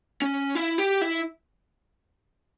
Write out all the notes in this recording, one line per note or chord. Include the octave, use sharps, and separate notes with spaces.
C#4
E4
G4
E4